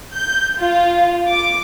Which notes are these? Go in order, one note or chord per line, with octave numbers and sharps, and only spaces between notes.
G6
F4
D6